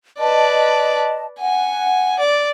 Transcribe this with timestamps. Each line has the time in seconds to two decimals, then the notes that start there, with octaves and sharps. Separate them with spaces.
0.19 B4 D5 D#5 A5
1.40 F#5 G#5
2.19 D5